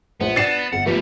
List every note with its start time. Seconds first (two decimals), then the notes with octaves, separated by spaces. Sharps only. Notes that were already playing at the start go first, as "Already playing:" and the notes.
0.21 A#1 B3 C5
0.36 D4 A6 C7 E7
0.73 G1 F#5
0.86 F3 A3 B3 G4